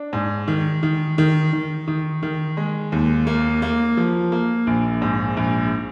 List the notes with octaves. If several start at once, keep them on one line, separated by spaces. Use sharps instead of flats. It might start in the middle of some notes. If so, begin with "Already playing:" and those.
Already playing: D4
G#2
D#3
D#3
D#3
D#3
D#3
D#3
G#3
D#2
A#3
A#3
F3
A#3
A#1
G#2
A#1